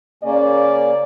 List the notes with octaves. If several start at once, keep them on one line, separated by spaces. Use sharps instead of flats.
C#3 A#3 C#4 D5